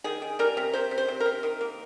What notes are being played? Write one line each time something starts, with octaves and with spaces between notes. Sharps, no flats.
D#3 G#4
D#3
G3 A#4
C3
C3 C5
C3
C5
C3
A#4
C3
D#3
A#3